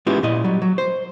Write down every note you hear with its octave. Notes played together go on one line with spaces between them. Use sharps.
G#3 B3 C#4 E4 F4 G4
A#2 E4 D#5
F#3 G3
F#3
C5